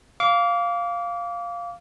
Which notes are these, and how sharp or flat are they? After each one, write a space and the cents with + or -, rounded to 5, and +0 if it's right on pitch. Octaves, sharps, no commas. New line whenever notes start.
F5 +0 D6 -30